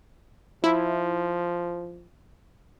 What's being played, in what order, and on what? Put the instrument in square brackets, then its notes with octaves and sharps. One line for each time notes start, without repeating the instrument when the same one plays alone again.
[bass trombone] F3 [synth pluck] E4